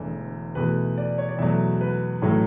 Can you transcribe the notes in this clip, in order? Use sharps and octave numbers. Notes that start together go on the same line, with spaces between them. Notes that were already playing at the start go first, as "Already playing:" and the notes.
Already playing: E1 E2 D3 A3
E2 B2 A3 B4
D5
C#5
D5
E2 B2 F#3 A3 E5
B4
A1 A2 F#3 A3 C#5